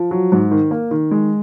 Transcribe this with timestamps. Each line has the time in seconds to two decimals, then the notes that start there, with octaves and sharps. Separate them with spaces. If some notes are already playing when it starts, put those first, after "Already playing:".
Already playing: F3
0.11 F#3
0.32 G#2
0.51 D#3
0.71 A#3
0.91 D#3
1.11 G#3